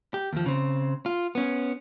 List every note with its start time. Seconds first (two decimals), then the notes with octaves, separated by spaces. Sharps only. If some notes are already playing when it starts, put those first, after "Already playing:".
0.14 G4
0.33 D#2 F3
0.46 C#3 C4
1.06 F4
1.35 B3 C#4